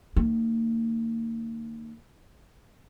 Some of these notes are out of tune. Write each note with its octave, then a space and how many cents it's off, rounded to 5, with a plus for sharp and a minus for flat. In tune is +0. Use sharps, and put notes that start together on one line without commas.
D#3 -30 A#3 -35